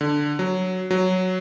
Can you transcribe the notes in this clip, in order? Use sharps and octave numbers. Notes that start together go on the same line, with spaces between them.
D3
F#3
F#3